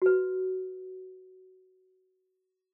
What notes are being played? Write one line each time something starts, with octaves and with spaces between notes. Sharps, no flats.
F#4 B4